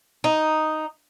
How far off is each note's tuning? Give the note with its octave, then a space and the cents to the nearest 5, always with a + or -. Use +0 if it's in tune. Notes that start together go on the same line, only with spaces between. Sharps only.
D#4 +0